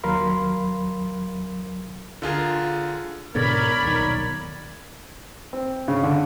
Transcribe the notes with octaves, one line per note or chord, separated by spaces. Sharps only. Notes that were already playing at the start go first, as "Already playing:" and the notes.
D#2 F#3 A#4 F5 B5 C6
D3 F4 G#4 A#4
G#2 B2 D3 A#4 C#5 D5 B5
D#1 B1 D#3
C4
C#3
D3